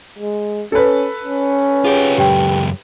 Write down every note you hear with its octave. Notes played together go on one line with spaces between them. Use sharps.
G#3
C#4 A4 B4
C#4
F4 G4 G#4 C#5
C#2 F#2 G4 G5